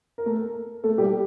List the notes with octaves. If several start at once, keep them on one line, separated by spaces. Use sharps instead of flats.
A#4
A3 A4
A3 A4
G3 G4